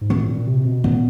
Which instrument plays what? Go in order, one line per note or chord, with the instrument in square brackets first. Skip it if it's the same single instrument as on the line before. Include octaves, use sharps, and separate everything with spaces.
[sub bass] G#2
[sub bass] A2 [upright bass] C4
[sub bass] A#2
C3
B2
[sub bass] A#2 [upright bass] B3